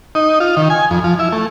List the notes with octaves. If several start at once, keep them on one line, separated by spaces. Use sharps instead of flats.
D#4
F4
D#3
G#5
F2
F3
E4
A3